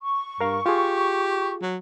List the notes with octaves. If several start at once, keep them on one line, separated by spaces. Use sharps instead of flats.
C#6
G2 A#4 F5
F4 G4 G#4
F#3